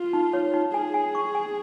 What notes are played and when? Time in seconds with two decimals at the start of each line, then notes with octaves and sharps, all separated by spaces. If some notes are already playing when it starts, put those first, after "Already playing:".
Already playing: F4
0.13 D#4
0.33 C#5
0.53 D#4
0.73 G#4 G#5
0.94 G#5
1.15 C#6
1.35 G#5